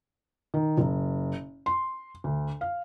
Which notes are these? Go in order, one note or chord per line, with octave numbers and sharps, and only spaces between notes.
D#3
F#1
C6
D2
F5